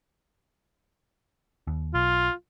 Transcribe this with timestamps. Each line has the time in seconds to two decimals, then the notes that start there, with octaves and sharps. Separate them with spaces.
1.67 D#2
1.94 B1 F4